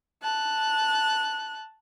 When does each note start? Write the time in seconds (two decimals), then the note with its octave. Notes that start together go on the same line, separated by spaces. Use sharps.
0.22 A5 F#6